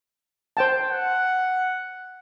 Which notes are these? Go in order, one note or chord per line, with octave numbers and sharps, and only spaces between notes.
C5 G5 A5
F#5